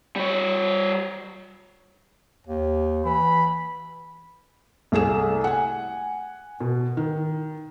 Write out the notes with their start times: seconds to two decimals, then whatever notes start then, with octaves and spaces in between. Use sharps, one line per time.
0.16 G3 C#5
2.47 D#2
3.05 E3 B5
4.92 C2 A3 G#4 E7
5.44 F#5 G#5
6.60 B2
6.97 D#3